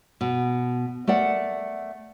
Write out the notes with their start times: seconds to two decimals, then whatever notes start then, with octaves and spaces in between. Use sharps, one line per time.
0.21 B2
1.07 A3 A#4 D5 F#5